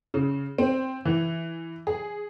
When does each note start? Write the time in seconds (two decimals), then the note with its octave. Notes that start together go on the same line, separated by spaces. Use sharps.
0.14 C#3
0.58 C4
1.05 E3
1.87 G#4